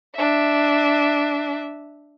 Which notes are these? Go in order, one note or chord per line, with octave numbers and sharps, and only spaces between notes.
D4 E5